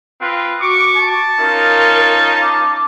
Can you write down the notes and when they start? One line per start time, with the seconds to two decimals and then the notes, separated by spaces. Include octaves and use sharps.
0.21 C4 F4 B4
0.61 F#4 C#6 D6
0.97 A5
1.39 C#4 D#4 F4 A#4
2.41 D6